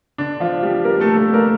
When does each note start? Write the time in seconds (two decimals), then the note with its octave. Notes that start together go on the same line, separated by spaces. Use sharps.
0.18 D3 D4
0.40 F3 F4
0.63 G3 G4
0.84 A#3 A#4
1.00 A3 A4
1.17 A3 A4
1.34 A#3 A#4